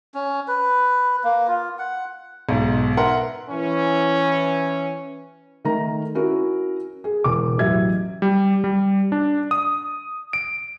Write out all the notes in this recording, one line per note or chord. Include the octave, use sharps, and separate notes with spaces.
C#4
B4
A#3
F4
F#5
B1 G#2
A#4 B4 E5 F#5 C6
E3 C#4
D#3 A3 A#4 A#5
C#4 E4 F#4 A#4
G#4
E1 D6
A1 F#3 G4 E5 G#6
G3
G3
D4
D#6
D7